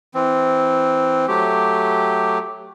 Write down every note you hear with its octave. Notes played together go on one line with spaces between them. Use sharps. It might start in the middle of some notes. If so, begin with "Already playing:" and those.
E3 C4
F#3 A3 G4